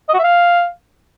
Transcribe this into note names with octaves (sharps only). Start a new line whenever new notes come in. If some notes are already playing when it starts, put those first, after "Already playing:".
D#5
F#4
E5
F5